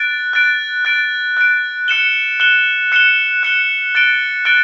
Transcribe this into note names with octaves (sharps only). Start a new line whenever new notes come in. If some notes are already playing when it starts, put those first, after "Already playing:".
Already playing: F#6 A6 D7
F#6 A6 D7
F#6 A6 D7
F#6 A6 D7
F#6 C#7 E7 G7
F#6 C#7 E7 G7
F#6 C#7 E7 G7
F#6 C#7 E7 G7
F#6 A6 D7 G7
F#6 A6 D7 G7